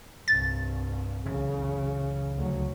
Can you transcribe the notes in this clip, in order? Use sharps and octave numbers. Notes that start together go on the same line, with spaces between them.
C2 G2 A6
F#1 C#2 C#3 E3
D2 F#3